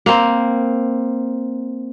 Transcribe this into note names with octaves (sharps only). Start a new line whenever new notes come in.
A#3 C4